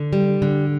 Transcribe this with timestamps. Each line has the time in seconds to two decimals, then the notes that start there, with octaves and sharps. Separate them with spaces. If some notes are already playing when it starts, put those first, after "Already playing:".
Already playing: D3
0.13 G3
0.42 D3